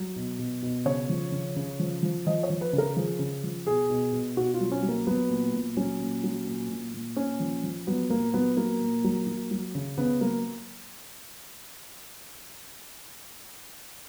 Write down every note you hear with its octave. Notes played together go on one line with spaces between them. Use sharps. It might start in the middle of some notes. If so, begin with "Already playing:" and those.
Already playing: F#3
B2
B2
B2
C#3 C#5
F3
C#3
C#3
F3
F3
F3 D#5
C#5
F3
B4
C#3
A#4
F3 G#4
C#3
F3
B2 G#4
B2
B2
B2 F#4
F4
F#3
C#4
F#3
A#3
F#3 B3
A#2
A#2
F#3 C#4
A#2
F#3
A#2
A#2
A#2
A#2 C#4
F3
F3
F#3 B3
A#2 A#3
F#3 B3
F#3 A#3
A#2
F#3
F#3
F#3
C#3
C#3 B3
F#3 A#3